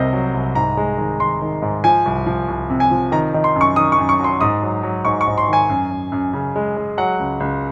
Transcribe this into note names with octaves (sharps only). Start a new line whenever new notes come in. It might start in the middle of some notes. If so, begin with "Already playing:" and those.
Already playing: C2 C3 A#4 C5 D#5
F#3
C2
G#2 A#5
G#3
D#3
D#3 C6
D#3
G#2
F3 G#5
C2
F3
C2
C3
G#5
F3
D#3 A#5
D#3
C6
F#2 C#6
D#3 D#6
C#6
F#2
C#6
F#3 C6
G#2 D#6
F#3
F#3
G#2 C#6
C#6
G#2
C6
D#3 G#5
F#2
F#2
F#2
C#3
G#3
G#3
F#3 F#5
C#2
C#2